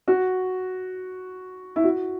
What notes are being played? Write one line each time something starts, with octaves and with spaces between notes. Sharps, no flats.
F#4
E4
F#4